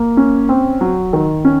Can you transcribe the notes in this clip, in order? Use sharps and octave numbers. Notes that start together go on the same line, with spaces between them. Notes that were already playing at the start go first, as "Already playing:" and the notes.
Already playing: A#3
C#4
C4
F#3
D#3
C#4